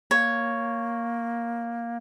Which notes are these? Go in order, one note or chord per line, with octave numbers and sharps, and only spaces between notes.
A#3 C#5